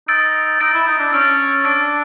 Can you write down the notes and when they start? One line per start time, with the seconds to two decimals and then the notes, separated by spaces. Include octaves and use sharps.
0.08 D#4 E6 A6 D7
0.60 D#4 E6 A6 D7
0.74 E4
0.87 D#4
0.99 D4
1.13 C#4 E6 A6 D7
1.64 D4 E6 A6 D7